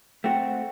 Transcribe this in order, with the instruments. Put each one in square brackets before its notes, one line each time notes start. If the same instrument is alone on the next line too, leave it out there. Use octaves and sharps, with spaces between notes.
[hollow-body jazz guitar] A3 C4 F#4 [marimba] G5